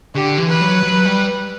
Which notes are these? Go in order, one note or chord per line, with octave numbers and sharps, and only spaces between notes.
D3 G4
E3
B4
F#3
F#3
G3